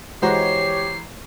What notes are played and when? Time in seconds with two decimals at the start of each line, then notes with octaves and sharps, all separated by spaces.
0.22 E3 G#3 F#4 G4 C5 C#5 A#5 C7